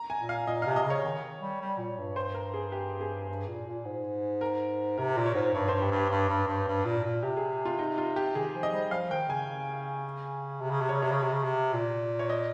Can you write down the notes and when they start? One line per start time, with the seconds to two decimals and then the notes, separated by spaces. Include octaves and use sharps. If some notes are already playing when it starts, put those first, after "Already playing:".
Already playing: A#5
0.10 G#5
0.20 A#2
0.29 F5
0.47 A#2 D#5
0.62 C3 F5
0.76 D#5
0.84 C#3
0.90 C#5
1.04 D#3
1.41 G3
1.61 G3
1.78 A#2
1.98 G2
2.16 C5
2.34 A#4
2.54 G#4
2.72 G4
3.01 G#4
3.29 G2
3.48 A#2
3.67 A#2
3.85 G#2
4.41 A#4
4.98 C3 A#4
5.17 A#2
5.26 C#5
5.35 G#2
5.54 G2 C#5
5.68 C5
5.73 G2
5.82 G4
5.91 G2
5.96 G4
6.10 G2
6.29 G2
6.47 G2
6.67 G2
6.85 A#2
7.05 A#2
7.23 C3 G4
7.37 G#4
7.65 F4
7.79 D#4
7.98 F4
8.16 G4
8.35 D#3 G#4
8.55 F3
8.63 D#5
8.74 G3
8.91 F3 F5
9.10 D#3 G5
9.29 C#3 G#5
10.61 C3
10.70 C#3
10.81 C3
10.89 C#3 C#5
11.02 C3 C#5
11.11 C#3
11.22 C3
11.32 C#3
11.43 C3
11.73 A#2
12.19 C#5
12.30 D#5